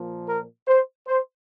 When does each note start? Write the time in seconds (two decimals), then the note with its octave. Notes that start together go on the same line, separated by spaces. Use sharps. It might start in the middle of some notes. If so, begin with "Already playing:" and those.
Already playing: A#2 F3 A#3
0.27 A#4
0.67 C5
1.06 C5